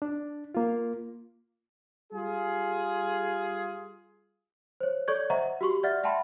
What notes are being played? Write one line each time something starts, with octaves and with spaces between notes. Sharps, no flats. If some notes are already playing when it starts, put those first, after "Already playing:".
D4
A#3 F4
G3 F4 G#4
C5 C#5
A4 C#5 D5 C#6 G6 G#6
C5 D#5 E5 F#5 A#5 C#6
F#4 G4 C6 C#6
D5 E5 F#5 F6 A6
E5 F#5 G5 A5 B5 C6